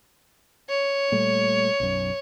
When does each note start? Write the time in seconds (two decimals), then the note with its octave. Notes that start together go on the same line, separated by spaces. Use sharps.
0.69 C#5
1.12 A#2 G3 A3
1.80 B1 F#2